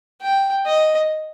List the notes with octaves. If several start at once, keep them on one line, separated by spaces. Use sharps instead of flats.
G5
D#5